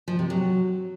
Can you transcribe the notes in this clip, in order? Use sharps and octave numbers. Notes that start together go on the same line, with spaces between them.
F3
C3
F#3